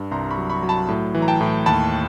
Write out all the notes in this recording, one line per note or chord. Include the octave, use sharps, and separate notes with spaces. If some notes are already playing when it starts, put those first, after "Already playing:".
Already playing: G2
C2 A#5 C6
B5 C#6
F#3
B5 C#6
F#3
A5 B5
A2
E3
A#5
G5 A5
A2
D#2 A5 B5